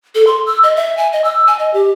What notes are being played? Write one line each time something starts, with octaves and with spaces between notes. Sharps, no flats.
A4
C6
E6
D#5
E5
G#5
D#5
E6
G#5
D#5
G4